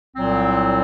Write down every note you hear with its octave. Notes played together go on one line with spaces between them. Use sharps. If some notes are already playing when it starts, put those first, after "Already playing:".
C2 A#2 F#3 C4